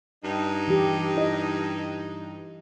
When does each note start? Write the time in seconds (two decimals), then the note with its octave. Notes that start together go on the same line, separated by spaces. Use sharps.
0.24 G2 D#4
0.68 E3 G4
1.15 E4 D#5